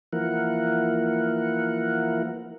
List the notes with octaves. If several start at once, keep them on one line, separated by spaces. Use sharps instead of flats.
E3 F3 A#3 E4 A#4 F#5